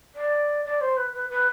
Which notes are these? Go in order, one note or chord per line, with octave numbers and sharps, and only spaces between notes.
D5
D5
C5
B4
B4
B4